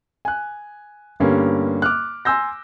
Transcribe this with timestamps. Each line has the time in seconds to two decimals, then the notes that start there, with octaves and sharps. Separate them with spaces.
0.25 G#5 F#6
1.20 G2 D3 G3 A#3 B3 C#4
1.82 D6 F6 F#6
2.25 G#5 C6 E6 G6 A#6